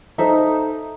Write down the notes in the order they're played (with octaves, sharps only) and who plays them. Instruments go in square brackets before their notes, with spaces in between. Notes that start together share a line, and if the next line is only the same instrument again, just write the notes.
[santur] D#4 [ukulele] A4 C5 E5